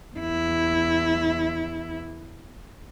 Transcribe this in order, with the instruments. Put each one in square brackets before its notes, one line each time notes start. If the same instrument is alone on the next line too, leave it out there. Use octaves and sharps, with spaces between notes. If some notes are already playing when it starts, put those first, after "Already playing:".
[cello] E2 E4